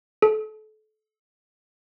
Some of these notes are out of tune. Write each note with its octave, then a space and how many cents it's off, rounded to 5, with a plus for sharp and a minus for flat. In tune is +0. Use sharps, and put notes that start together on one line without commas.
A4 -30